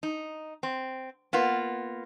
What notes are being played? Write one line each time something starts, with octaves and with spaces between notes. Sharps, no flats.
D#4
C4
A#3 B3 F4